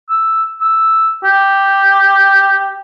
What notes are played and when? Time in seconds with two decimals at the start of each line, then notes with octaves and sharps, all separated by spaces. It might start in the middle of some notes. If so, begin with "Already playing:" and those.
0.09 E6
0.61 E6
1.24 G4